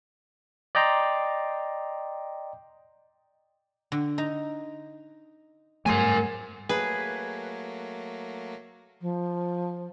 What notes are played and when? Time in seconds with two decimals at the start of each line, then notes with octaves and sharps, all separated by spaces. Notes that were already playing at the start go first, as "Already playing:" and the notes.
0.75 D5 D#5 G5 A#5 C6
3.92 D3
4.18 D#4 A#5
5.86 G2 F#3 A3 G#4 A#4 C5 G#5
6.69 F#3 A3 A#3 G#4 B4
9.01 F3